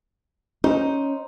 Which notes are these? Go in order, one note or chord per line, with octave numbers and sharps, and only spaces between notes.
C#4 D#4 C5